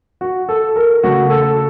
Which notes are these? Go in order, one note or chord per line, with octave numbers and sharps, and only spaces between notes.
F#4
A4
A#4
C#3 A3 F#4
A4